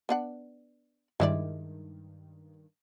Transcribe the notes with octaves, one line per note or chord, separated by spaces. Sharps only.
B3 D4 F#5
G2 D#3 G#3 E4 D5